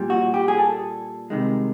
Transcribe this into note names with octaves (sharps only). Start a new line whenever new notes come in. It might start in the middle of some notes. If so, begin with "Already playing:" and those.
Already playing: A#2 G3
F#4
G4
G#4
A4
C2 C3 D#3 G#3